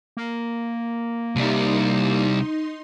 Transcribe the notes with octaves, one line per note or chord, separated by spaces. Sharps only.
A#3
C2 G3 D#4 C6